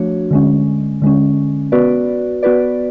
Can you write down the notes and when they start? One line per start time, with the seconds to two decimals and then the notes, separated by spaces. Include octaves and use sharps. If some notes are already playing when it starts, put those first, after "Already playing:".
Already playing: F3 A3 D4 F#4 C#5
0.31 D3 G#3 C#4
1.02 D3 G#3 C#4
1.72 B3 F#4 B4 D5
2.43 B3 F#4 B4 D5